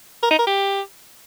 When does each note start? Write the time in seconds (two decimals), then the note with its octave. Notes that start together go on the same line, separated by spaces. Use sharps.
0.23 A#4
0.31 D#4
0.39 A#4
0.47 G4